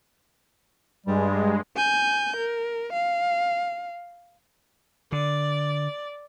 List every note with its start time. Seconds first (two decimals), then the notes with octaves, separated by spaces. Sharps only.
1.06 G2 G3 G#3
1.76 G#5 G6
2.37 A#4
2.93 F5
5.12 D3 D5